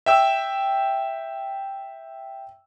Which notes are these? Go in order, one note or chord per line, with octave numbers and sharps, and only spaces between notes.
E5 G5 E6